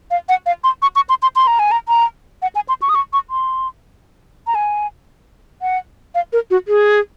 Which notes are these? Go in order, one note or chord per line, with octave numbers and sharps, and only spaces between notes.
F5
F#5
F5
C6
C#6
C#6
C6
C6
C6
A#5
G#5
A#5
A#5
F#5
G#5
C6
C#6
D#6
C#6
C#6
C6
A#5
G#5
F#5
F5
A#4
F#4
G#4